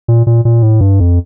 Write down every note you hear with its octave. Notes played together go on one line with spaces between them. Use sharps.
A#2
A#2
A#2
A2
G2
F2